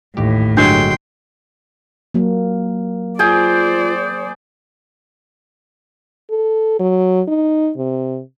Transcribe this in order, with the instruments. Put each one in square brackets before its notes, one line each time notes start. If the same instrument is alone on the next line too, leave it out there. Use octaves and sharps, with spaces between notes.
[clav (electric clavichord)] A1 D#2 G4 [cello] A2
[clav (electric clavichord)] G1 F#3 G#3 [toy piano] D4 [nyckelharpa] G5 C6
[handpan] F#3 A#3
[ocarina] F4 [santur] G#4 G5 [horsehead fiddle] C5 D5
[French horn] A4
F#3
D#4
C3